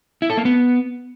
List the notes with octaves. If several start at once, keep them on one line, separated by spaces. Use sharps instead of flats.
E4
A4
A#3
B3